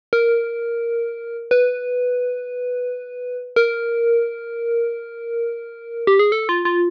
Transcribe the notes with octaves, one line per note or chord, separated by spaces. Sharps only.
A#4
B4
A#4
G4
G#4
A4
F4
F4